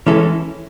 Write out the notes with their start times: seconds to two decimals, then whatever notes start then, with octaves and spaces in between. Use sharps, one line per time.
0.07 E3 G#3 C#4 E4 A4